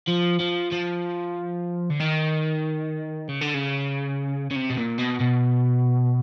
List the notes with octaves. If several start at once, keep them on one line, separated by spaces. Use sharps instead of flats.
F3
F3
F3
D3
D#3
C#3
D3
C#3
C#3
C3
B2
A#2
B2
B2